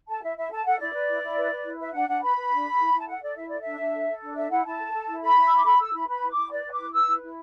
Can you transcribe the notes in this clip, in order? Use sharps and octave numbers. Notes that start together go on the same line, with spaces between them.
A4 A5
E4 E5
E4 E5
A4 A5
A4 F#5
E4 D5
B4
E4
E4
B4
B4
E4
B4 E5
D4 F#5
D4 F#5
B4 B5
B4
D4
A4
E4
E4
A5
A4 F#5
A4 D5
E4 E5
A4 D5
D4 E5
D4
A4
A4
D4
A4 E5
E4 F#5
E4 A5
A4
A4
E4
A4 B5
E4
E6
E4 D6
A4 B5
A4 E6
E4 B5
B4 B5
E4
D6
E4
B4 D5
B4
D6
E4
B4 E6
E4
E4